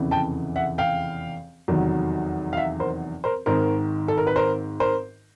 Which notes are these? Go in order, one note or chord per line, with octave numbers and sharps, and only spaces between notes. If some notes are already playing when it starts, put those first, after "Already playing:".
Already playing: F1 E2 C#3 E3
G5 A5
E5 F#5
F5 G5
F1 E2 C3 D#3 F#3
F5
E5 F#5
A#4 C5
A#4 C5
G#1 G#2 D#3 A#4 C5
A4
A#4
B4
A#4 C5
A#4 C5